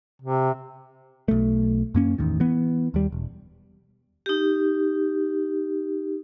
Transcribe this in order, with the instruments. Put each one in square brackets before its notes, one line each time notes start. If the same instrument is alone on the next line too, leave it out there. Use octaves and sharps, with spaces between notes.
[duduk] C3
[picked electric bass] B1 A3
F#2 A#3 C#4
A1 E2 G#2 D#3
E3 B3
D#2 G3
E1
[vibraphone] D#4 G4